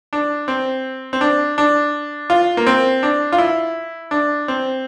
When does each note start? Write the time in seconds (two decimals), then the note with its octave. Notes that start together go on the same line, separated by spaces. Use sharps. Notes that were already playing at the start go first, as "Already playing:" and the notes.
0.13 D4
0.48 C4
1.13 C4
1.21 D4
1.58 D4
2.30 F4
2.57 A#3
2.67 C4
3.03 D4
3.32 F4
3.38 E4
4.11 D4
4.48 C4